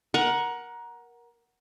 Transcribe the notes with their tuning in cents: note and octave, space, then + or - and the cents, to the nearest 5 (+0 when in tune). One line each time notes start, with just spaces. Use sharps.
A#4 +20 F#5 +0